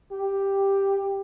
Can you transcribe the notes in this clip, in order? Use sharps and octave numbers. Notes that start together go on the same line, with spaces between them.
G4